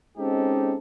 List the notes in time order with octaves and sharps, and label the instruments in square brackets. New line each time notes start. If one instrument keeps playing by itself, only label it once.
[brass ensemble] G#3 C4 C#4 D#4 G4 A4